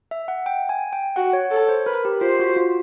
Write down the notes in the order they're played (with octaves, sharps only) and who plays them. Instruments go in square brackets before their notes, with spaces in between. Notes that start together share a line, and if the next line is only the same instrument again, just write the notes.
[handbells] E5
F#5
G5
G#5
G5
[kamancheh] F#4 [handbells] F#5
[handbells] C#5
[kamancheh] A4 [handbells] C#5
[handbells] C5
[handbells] A#4 [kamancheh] B4
[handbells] G4
[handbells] F4 [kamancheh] C5
[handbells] F#4
F4